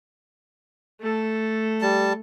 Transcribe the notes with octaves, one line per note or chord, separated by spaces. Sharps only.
A3 A4
G3 A5